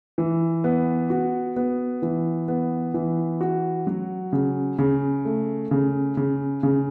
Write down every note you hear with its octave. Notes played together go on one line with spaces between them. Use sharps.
E3
B3
F#4
B3
E3
B3
E3
F#4
F#3
C#3
C#3
A3
C#3
C#3
C#3